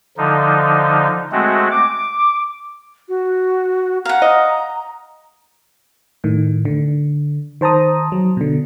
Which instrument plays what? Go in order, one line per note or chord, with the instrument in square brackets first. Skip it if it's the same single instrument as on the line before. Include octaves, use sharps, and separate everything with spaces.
[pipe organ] D3 F3 D#4
G#3 A3 C4 F#4
D6
[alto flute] F#4
[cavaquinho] F5 F#5 [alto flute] A#5
[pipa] D#5
[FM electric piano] A2 D#3
D3
D#3 C5 A5 A#5 D#6
F#3
B2 D3